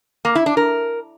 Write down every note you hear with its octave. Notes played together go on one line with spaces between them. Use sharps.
A#3
E4
D4
A#4